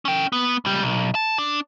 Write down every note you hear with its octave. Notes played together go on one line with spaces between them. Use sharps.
C#4 G5
B3
C#2 G3
B1
A5
D4